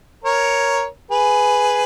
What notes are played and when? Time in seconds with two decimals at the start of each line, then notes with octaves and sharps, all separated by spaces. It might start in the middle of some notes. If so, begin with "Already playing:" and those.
0.24 A#4 C#5
1.11 G#4 B4